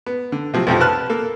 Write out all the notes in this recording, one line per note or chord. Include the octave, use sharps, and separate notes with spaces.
B3
D3
C3 F3 F#3
B1 F2 C3 F3
B4 A5 F6 F#6
A#3 A4